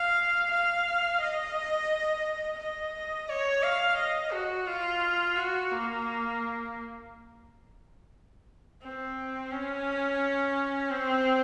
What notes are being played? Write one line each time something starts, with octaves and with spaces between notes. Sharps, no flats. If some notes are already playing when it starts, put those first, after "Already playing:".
Already playing: F5
F5
D#5
D#5
C#5
F5
D#5
F#4
F4
F#4
A#3
C4
C#4
C4